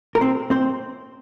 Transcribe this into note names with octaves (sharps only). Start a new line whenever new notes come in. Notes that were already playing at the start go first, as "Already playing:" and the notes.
A#4
C4 C5
C4 C5